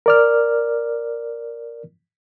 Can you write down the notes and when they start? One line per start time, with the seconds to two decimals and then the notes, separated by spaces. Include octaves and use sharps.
0.06 A#4 D5 F6